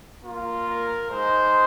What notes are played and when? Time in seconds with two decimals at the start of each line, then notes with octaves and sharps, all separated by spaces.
0.25 A#3 F4
0.67 A#4
1.10 G#3 D#4 C5